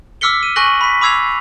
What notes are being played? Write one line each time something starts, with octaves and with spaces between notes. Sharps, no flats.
D6 E6 F6 B6 C#7 G7
D#7
G#5 C#6 F#6 A#6 F#7
B5 B6
B5 D6 E6 G#6 C7 F7